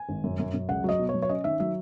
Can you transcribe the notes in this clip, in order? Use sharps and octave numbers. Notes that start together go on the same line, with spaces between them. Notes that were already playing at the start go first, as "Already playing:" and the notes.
Already playing: G#5
G#1
F#2
F#2
F#2
C#2 F#5
F#3 D#5
B2
C#5
F#3
C#5
C#4 D#5
D#3 E5
F#3 E5